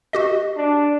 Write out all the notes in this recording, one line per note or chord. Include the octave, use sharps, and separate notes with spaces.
F#4 G4 D#5
D4